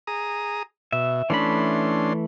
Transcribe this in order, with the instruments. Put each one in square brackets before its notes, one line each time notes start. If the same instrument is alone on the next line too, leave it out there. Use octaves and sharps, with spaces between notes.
[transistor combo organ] G#4 A#5 D#6
[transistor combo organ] B2 [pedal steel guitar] E5
[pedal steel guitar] E3 A3 B5 [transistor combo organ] C#4 D4 C6